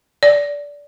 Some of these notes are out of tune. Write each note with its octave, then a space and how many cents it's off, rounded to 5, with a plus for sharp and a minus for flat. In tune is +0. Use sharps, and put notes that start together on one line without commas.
D5 -20